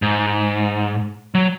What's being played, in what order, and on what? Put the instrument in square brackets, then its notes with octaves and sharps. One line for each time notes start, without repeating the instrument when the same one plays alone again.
[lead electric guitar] G#2
F#3